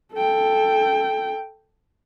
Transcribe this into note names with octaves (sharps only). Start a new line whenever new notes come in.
A4 G5